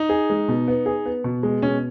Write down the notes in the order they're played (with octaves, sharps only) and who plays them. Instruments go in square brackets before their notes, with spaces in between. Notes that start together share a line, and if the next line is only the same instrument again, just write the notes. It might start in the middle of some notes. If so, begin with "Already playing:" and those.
Already playing: [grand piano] D#4
[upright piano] G#4
G#3
B2
B3
G#4
B3
B2
G#3
[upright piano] B2 [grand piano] C#4